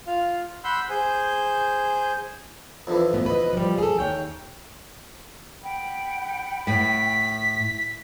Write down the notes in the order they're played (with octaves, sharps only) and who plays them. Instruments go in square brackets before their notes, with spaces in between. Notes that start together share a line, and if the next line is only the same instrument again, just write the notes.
[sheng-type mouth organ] F4 F5
F#5 B5 C6 E6 G6
G#4 C5 G#5 G6
[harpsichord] F2 D3 E3
[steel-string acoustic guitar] A2 B3
B4 D#5
F3 G3
G#4 A4
D#2 C#5 G5
[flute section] F#5 G5 B5
[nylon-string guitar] A2 [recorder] B6